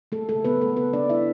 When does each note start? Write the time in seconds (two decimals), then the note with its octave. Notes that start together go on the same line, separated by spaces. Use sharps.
0.12 A3 A4
0.29 C#3 A3 A4
0.44 B3 B4
0.55 F#3
0.62 A3 A4
0.77 C#3 B3 B4
0.93 D4 D5
0.99 A3
1.09 E4 E5